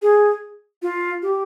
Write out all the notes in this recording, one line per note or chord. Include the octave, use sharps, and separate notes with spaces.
G#4
F4
G4